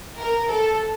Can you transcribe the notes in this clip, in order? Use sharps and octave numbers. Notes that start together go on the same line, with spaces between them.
A#4
A4